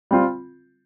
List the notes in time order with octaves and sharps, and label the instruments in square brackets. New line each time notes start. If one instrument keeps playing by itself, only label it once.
[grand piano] G3 C4 F4